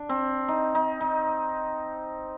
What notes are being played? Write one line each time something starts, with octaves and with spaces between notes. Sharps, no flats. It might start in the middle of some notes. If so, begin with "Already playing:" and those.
Already playing: D4
C4
D#4
D#4
D#4